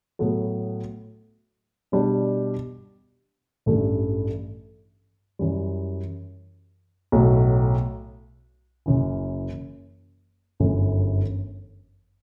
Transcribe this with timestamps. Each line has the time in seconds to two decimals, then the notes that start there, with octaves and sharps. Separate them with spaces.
0.19 A2 F#3 B3 F#4 A4
1.92 B2 G3 D4
3.66 A1 G2 E3 A3
5.39 F#2 E3 G3
7.12 B1 A2 F#3
8.86 F#1 F#2 E3
10.60 G1 F#2 E3 A3